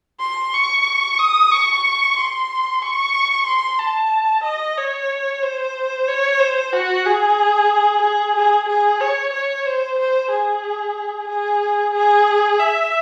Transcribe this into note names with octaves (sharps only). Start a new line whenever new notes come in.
C6
C#6
D#6
C#6
C6
C#6
C6
A5
D#5
C#5
C5
C#5
C5
F#4
G#4
G#4
G#4
G#4
C#5
C#5
C5
C5
G#4
G#4
G#4
E5